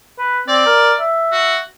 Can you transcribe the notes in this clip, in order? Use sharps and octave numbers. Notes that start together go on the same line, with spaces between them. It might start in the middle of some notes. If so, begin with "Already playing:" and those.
B4
C4 D5
A#4
E5
F#4